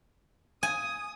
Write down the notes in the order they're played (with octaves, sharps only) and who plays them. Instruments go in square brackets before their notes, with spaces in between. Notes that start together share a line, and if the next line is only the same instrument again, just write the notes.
[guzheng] G#5 [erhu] D#6